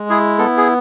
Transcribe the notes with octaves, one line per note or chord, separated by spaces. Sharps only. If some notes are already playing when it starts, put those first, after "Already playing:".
Already playing: G#3
E4 G#4
B3 A4
G#4